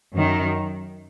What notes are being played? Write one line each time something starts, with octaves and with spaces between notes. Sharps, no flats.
F#2 D#3 F#3